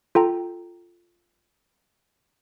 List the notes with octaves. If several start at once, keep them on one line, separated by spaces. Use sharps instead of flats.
F4 A4 G5 A#5